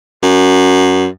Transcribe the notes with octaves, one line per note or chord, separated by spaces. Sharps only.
F#2